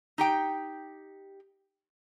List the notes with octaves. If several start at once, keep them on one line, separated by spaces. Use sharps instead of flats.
D#4 G4 G5